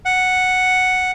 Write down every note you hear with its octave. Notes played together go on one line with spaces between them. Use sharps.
F#5